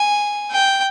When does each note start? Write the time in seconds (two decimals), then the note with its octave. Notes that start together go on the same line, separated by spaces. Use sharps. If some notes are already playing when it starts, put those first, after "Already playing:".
Already playing: G#5
0.51 G5